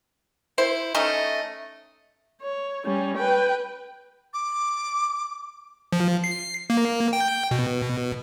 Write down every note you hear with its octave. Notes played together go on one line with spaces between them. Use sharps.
E4 C5
A3 C#4 D#4 D#5
C#5
G3 C#4
B4 G5
D6
F3
C7
A#3
G5
B2